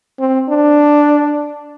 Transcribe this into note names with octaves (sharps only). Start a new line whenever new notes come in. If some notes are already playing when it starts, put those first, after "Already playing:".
C4
D4